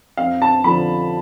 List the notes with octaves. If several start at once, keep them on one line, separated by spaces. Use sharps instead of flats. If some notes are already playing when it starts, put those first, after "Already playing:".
F2 F5
A5
D3 F3 B5